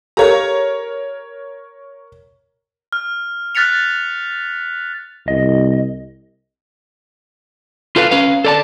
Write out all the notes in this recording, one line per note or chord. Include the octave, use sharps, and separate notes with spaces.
G4 A4 A#4 C#5 F5 A#5
F6
F6 F#6 A6 B6 C#7 F7
C2 D#5
F4 A4 B4 F5
C#4 B4 F5
A4 D5 A5